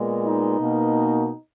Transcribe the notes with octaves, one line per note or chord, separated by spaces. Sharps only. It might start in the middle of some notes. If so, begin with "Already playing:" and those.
Already playing: A#2 G#3 B3
D#4
B2 A#3